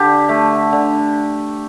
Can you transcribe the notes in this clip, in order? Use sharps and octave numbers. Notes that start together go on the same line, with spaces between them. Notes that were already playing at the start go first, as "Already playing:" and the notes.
Already playing: D3 G4
A3
D3